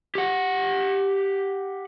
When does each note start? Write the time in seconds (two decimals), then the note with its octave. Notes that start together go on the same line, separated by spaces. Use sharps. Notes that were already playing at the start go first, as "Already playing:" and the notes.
0.15 G4 F#5